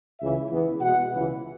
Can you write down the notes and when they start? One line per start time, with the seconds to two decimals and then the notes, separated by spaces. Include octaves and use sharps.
0.20 C#2 C#3 E3 E5
0.51 E2 E3 B3
0.81 B2 G#3 B3 F#5
1.13 C#2 C#3 E3